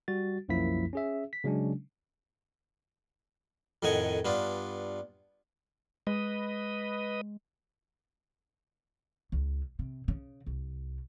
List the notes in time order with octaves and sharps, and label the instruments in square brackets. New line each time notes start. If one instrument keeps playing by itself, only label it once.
[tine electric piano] G3 F#4 A6
C2 F#2 F3 A#3 E4 B6
C#4 G#4 E5
B6
C#3 F#3 G#3 C#4 D4
[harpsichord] F2 A2 D#3 D#5 F#5 G#5
G2 B3 D4 F4
[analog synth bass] G#3 [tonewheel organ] B4 D#5
[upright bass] C#2
C3
C#3
C2